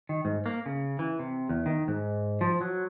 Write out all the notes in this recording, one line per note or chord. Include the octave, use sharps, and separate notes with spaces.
D#3
G#2
A#3
C#3
E3
C3
E2
D#3
G#2
F3
F#3